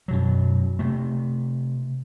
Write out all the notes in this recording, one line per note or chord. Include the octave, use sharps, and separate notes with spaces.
F#2 B2 F#3
C3 A3